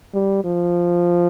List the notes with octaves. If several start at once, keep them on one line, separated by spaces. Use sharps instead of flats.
G3
F3